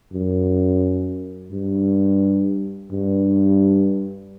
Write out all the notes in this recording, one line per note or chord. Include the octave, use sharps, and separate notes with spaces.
F#2
G2
G2